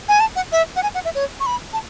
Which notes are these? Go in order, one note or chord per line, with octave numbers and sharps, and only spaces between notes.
G#5
A5
F#5
E5
F#5
G#5
F#5
E5
C#5
C#6
B5
A5